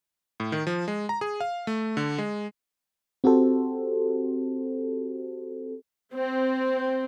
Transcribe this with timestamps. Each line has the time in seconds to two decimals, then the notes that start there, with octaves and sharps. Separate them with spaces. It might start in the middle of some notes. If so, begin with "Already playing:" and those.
0.40 A2
0.52 D#3
0.67 F3
0.88 G#3
1.09 A#5
1.21 G#4
1.40 F5
1.67 A3
1.97 D3
2.18 G#3
3.24 C4 F#4 G4 A4 C5
6.14 C4